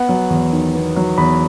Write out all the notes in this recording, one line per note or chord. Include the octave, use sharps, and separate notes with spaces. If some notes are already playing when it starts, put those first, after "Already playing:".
Already playing: B3 F#5
F#3
E2
D#3
B3
F#3
E2 B5